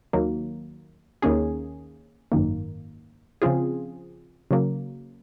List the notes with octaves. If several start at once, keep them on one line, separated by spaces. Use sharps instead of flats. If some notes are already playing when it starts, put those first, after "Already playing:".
D#2 D#3 F#3 A#3
D#2 D#3 A#3 C#4 G#4
G#1 F#2 D#3 A#3
C#3 F3 C4 F4 G#4
C#3 F#3 A#3